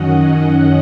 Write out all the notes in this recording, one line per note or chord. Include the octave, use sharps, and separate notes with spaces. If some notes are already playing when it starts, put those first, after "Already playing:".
Already playing: F#2 D#3 F#3 C#4 D#5 F#5